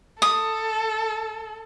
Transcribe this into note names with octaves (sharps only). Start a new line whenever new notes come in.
A4 D#6